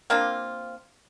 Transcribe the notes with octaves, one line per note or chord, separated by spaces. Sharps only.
A#3 C4 D4 F4